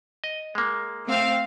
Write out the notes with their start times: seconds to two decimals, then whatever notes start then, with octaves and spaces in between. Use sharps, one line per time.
0.24 D#5
0.55 G#3 A#3
1.06 A3 C4 F5